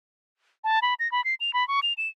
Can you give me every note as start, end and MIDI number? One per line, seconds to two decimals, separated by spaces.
0.64 0.79 81
0.82 0.94 83
1.00 1.10 94
1.12 1.24 83
1.24 1.35 96
1.40 1.53 101
1.53 1.66 83
1.68 1.80 85
1.83 1.93 101
1.98 2.08 100